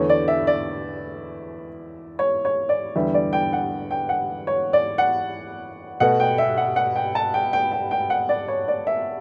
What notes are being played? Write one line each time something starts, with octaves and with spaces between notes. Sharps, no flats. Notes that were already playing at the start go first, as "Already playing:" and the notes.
Already playing: E2 D3 A3 C#5
D5
E5
D5
C#5
C#5
D5
E2 D3 G3 E5
D5
G5
F#5
G5
F#5
C#5
D5
F#5
B2 A3 F#5
G5
E5
F#5
F#5
G5
A5
G5
G5
G5
G5
F#5
D5
C#5
D5
E5